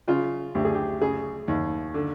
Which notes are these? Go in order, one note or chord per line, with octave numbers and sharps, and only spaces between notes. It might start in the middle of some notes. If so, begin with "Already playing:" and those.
C#3 F4
D2 G4
G#4
G4
C#3 G#4
D#2
D3